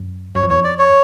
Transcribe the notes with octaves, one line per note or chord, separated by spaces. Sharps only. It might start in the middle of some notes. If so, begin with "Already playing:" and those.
Already playing: F#2
F#2 C#5
F2
E2 C#5
F2
D5
C#5